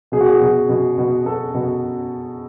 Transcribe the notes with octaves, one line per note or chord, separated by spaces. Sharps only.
B2 G#4
F#4
G#4
B2
B2
B2
B2 A4
B2